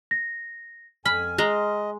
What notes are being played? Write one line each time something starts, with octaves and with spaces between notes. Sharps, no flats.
A#6
F2 G#5 B5 F6
G#3 D#5 A#5